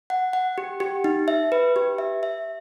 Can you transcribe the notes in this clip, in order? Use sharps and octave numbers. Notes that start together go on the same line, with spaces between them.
F#5
F#5
G4
G4
D#4
E5
B4
G4
E5
E5